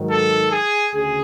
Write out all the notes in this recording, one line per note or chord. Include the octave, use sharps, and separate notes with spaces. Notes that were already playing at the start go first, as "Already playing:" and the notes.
Already playing: G#2 D#3 F#3
A4
G#4
D2 C#3 G#4